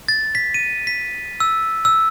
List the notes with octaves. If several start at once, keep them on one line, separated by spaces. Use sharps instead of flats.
A6
B6
D#7
B6
E6
E6